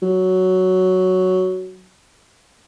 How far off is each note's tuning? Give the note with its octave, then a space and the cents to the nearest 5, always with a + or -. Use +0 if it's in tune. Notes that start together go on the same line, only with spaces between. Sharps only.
F#3 +5